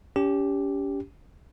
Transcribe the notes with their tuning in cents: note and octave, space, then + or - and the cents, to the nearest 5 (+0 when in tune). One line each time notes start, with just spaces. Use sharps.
C#4 +35 G4 +0